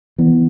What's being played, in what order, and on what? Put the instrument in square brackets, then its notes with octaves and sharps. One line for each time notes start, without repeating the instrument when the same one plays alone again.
[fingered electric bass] E3 B3